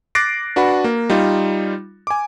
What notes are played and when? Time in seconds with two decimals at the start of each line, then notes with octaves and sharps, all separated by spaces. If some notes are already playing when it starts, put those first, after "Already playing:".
0.15 D6 F#6 A6 A#6 C7 D7
0.56 D4 F#4 B4 F#5 B5
0.84 A#3
1.10 G3 D#4 F4
2.07 G#5 D6